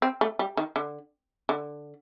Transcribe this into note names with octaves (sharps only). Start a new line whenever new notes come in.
C4
A3
G3
D#3
D3
D3